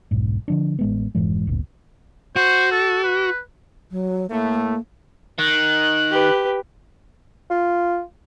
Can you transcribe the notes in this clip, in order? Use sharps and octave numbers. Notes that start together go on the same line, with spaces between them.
F1 B1 G#2
D3 F3 D4
A1 G#3 B3
F1 G#2 E3 G#3
D1 G1 D2 A#2
F#4 C5
A4
B4
F#3
A2 A3 A#3
D#3 F#6
G4 B4
F4